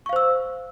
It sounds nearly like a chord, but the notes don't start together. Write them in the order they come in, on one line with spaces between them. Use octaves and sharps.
C#6 F5 C5 E6